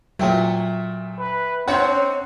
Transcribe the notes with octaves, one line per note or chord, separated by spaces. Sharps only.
A#2 F#3 A3 E5 G5
B4
C4 C#4 D#4 C#5 F#5 C6